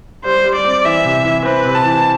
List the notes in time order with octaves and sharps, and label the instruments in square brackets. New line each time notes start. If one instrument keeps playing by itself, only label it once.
[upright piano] G3 [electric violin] C5
[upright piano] G3
[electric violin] D5
[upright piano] C4
[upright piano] E3 [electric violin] E5
[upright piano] C3
E3
[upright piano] C4 [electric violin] B4
[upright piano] C3
[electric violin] A5
[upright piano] E3